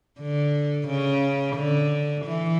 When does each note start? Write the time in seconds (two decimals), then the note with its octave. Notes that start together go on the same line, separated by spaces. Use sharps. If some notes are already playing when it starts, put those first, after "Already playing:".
0.21 D3
0.88 C#3
1.56 D3
2.24 E3